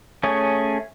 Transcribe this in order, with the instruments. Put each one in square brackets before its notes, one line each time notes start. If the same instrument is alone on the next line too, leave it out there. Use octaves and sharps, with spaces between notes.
[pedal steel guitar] A3 C#4 G#4 C#5